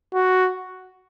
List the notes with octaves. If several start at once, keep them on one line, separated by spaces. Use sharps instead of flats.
F#4